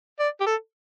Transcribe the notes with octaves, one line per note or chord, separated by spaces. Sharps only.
D5
G4
A4